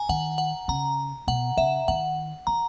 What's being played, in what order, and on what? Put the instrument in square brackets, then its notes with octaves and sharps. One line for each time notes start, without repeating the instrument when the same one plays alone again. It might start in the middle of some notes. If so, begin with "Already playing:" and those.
Already playing: [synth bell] G#5 A#5
[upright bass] D#3 [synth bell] F#5
[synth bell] F#5
[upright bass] C#3 [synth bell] A#5
[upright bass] B2 [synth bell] F#5
[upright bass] C#3 [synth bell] E5
[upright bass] D#3 [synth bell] F#5
[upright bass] E3 [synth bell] A#5